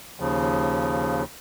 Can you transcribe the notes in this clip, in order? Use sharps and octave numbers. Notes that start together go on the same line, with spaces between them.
D#2 C#3 F3